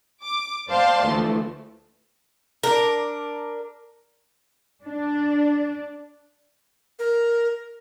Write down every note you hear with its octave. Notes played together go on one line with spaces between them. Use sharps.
D6
C5 D5 F5 G5 A5 C6
D2 E3 F3 A3
D4 A#4
D4
A#4